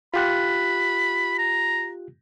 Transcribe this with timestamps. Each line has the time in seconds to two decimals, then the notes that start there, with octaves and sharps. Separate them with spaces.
0.14 F4 G4 B5 F#6
1.38 A#5